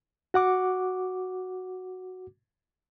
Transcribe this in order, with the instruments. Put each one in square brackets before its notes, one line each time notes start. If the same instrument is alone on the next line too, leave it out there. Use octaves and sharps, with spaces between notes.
[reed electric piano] F#4 F#5 D6